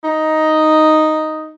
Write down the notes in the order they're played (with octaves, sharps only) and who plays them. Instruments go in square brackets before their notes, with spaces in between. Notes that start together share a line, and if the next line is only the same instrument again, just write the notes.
[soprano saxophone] D#4